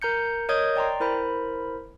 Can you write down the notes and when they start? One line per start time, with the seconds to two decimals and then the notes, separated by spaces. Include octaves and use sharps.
0.02 A#4 A#5 G6 C#7
0.49 A#4 C#5 D#5 D#6 G6 G#6
0.76 D5 G5 A#5 C6
1.00 E4 A#4 C5 B5